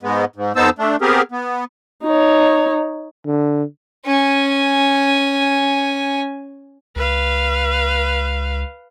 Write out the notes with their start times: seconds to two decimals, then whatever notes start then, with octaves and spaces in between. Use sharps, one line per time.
0.03 G#2 G#3 B3
0.36 G#2
0.56 F2 B3 D#4 C5 A5 E6
0.79 A3 D4
1.01 B3 C4 G4 G#4 A#4
1.32 B3
2.03 D#4 C#5
3.26 D3
4.05 C#4 G#5
6.96 C#2 B4 F5